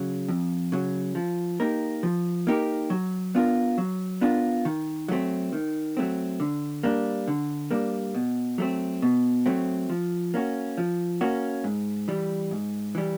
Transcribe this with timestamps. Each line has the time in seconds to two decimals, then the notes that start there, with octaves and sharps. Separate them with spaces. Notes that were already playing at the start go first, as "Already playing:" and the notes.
Already playing: C#3 F#3
0.28 F2
0.72 C#3 F#3
1.15 F3
1.60 A#3 D#4 G4 A#4
2.03 F3
2.47 A#3 D#4 G4 A#4
2.90 F#3
3.35 B3 D4 F4 A#4
3.78 F#3
4.21 B3 D4 F4 A#4
4.65 D#3
5.08 F#3 A3 C4
5.53 D#3
5.97 F#3 A3 C4
6.40 D3
6.83 G3 A#3 D4
7.28 D3
7.71 G3 A#3 D4
8.15 B2
8.58 F#3 A3 C4
9.02 B2
9.46 F#3 A3 C4
9.90 F3
10.34 A#3 C#4 F#4
10.78 F3
11.21 A#3 C#4 F#4
11.64 G#2
12.08 E3 G3
12.51 G#2
12.95 E3 G3